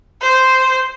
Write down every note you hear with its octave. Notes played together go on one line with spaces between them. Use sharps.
C5